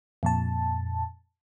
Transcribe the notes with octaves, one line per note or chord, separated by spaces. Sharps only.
F2 A#2 A5